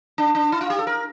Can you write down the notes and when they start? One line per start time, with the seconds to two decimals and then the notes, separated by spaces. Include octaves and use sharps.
0.18 D4
0.35 D4
0.52 E4
0.61 F4
0.70 G4
0.79 A4
0.87 A#4